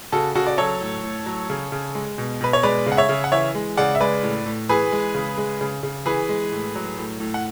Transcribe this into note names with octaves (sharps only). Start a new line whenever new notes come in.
C#3 F#4 A4
C#3 F#4 A4
D5
F#3 A4 C#5
A2
A2
F#3
C#3
C#3
G#3
B2
B2 B4
C#5
G#3 B4 D5
C#3
F#5
C#5 E5
C#3
F#5
E3 C#5 E5
G#3
C#3 D5 F#5
E5
G#3 B4 D5
A2
A2
E3 G#4 B4
G#3
C#3
G#3
C#3
C#3
E3 G#4 B4
G#3
A2
F#3
A2
A2
F#5